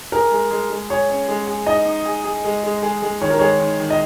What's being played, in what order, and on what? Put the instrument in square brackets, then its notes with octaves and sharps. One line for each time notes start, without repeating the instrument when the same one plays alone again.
[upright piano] G#4 [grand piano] A#4
[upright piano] G#3
G#3
G#3
[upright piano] G#4 [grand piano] C#5
[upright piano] C#4
G#3
G#4
[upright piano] D#4 [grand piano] D#5
[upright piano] D#4
G#4
G#4
G#3
G#3
G#3
G#3
[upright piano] D#3 [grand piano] C#5
[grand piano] A#4
[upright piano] G#3 [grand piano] C#5
[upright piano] D#3
D#3
[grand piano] D#5